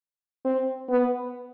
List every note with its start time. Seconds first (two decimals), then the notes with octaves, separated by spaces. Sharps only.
0.45 C4
0.89 B3